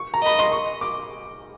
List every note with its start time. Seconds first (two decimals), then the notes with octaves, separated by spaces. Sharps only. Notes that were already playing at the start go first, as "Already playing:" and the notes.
Already playing: C#6
0.14 A#5
0.22 D#5 B5
0.39 C6
0.52 C#6
0.81 D6